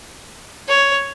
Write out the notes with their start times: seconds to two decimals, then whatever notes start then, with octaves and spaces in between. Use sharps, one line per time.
0.68 C#5